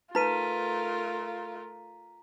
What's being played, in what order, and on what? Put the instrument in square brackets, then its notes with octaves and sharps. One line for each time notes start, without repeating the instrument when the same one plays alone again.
[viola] A3 A#4 [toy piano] D#4 B4 [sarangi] F4 [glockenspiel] A#5 B6 D#7